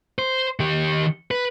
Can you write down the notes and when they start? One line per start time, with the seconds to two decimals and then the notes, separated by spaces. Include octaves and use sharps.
0.19 C5
0.60 D#3 G4
1.31 B4